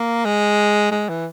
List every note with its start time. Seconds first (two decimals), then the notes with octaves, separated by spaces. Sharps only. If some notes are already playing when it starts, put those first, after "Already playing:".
Already playing: A#3
0.25 G#3
0.91 G#3
1.09 E3